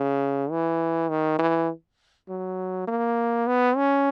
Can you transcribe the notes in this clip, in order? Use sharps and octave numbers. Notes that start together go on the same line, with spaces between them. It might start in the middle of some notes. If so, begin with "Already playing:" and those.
Already playing: C#3
E3
D#3
E3
F#3
A#3
B3
C#4